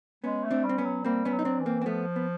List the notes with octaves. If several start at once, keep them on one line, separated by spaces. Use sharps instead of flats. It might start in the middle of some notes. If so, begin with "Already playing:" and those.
G#3 B3 C#4
A3
C4 D4
G3
C4
B3 C#4
F#3
G3 A#3 C4
B3 C#4
F#3
D#4
C4 D4
E3
A#3 C4
C4
F3 A3 B3
B3